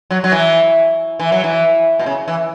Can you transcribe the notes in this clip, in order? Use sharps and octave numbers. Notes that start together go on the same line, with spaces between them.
F#3
F#3
E3
E3
F#3
E3
B2
C#3
E3